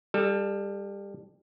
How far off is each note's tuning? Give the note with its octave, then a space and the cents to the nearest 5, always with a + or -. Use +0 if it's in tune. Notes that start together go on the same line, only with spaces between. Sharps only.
G3 +25 A4 +0